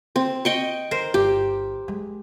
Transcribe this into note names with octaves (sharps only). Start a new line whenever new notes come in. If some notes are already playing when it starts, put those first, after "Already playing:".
C4
D#5 G5 C#6
D#3 A#4 C5
G1 G4
G#3